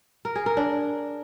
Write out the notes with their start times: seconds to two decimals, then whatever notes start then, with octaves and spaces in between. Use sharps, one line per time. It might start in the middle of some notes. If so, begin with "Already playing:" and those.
0.25 A#4
0.36 G#4
0.46 A#4
0.57 D4